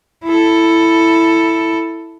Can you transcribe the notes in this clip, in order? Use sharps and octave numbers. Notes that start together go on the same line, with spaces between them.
E4 A4